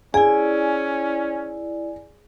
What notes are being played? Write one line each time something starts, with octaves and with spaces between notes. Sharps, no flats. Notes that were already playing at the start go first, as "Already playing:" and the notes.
C#4 E4 G#4 D5 G#5